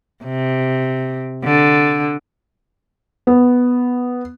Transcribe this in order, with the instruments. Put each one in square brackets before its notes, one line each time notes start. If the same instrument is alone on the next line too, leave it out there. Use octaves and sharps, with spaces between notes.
[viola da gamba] C3
D3
[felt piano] B3